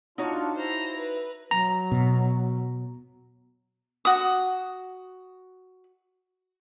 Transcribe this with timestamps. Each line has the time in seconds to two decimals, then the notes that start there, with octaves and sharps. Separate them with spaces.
0.18 D4 D#4 F4 F#4 C#5
0.56 E4 C5 A#5
0.96 B4
1.51 F#3 A#5
1.92 B2
4.05 F#4 D#6